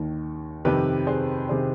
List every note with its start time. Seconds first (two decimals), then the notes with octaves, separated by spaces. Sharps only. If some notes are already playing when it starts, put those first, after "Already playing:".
Already playing: D#2 D#3
0.65 F2 C3 D#3 G4 B4
1.07 G#4 C5
1.49 C3 D#3 G#4 C5